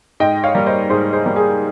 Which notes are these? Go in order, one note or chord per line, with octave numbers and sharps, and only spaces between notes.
G#2 D#5 G5
C#5 F5
G3 A#3
C5 D#5
G#2 G#4 C5
G#4 C5
G3 A#3
G#4